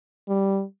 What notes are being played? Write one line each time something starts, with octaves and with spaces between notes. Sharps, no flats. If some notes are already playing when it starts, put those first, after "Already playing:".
G3